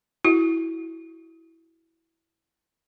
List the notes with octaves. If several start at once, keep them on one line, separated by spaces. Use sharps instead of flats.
E4 F#4